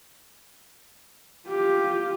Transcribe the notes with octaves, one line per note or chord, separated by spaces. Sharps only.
F4 G4